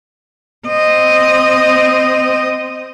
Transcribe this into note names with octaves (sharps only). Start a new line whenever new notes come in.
C4 D#5